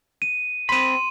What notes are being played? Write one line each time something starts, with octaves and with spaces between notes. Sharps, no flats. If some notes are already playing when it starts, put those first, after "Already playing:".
D#7
C4 B5 C6 D#7